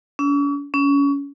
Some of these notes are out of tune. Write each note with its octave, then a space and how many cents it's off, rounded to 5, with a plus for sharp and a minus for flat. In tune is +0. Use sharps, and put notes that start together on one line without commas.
C#4 +45
C#4 +25